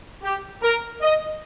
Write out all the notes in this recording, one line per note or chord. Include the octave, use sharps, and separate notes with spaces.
G4
A#4
D#5